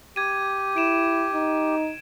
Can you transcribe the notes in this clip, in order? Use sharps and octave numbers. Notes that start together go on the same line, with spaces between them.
G4 G#6 D#7
E4 D7 E7
D#4